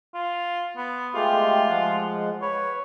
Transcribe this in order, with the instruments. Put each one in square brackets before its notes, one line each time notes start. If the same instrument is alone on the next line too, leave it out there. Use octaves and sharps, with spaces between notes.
[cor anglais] F4
B3
[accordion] G#3 A3 G4 [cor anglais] F4
[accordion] F3 G#3 F#5
[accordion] B4 [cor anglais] C#5